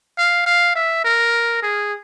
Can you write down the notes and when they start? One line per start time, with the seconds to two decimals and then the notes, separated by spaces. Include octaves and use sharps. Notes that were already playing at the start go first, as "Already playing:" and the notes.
0.18 F5
0.46 F5
0.75 E5
1.04 A#4
1.63 G#4